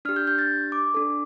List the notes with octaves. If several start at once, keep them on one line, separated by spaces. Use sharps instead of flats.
D4 G4 F6
G6
G6
A6
D6
D4 A4